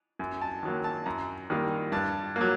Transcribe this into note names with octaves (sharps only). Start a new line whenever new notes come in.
F#2
A5
D#3 F#3 A#3
A5
F#2 A#5
D#3 G3 A#3
G2 A5
F#3 A#3